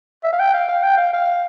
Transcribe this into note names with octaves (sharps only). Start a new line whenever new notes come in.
E5
F5
G5
F5
F5
G5
F5
F5